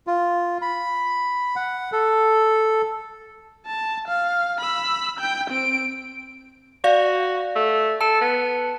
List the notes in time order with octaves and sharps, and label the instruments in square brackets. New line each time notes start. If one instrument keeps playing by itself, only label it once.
[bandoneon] F4
B5
F#5
A4
[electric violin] A5
F5
B5 E6
G5 G6
C4 D7
[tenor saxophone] F#4 [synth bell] D5 F5
[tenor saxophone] A3
[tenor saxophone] A4 [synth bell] A5
[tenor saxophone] B3